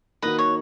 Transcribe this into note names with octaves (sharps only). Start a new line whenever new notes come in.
D#3 A#3 D#4 F#4 B4 D#5
C#5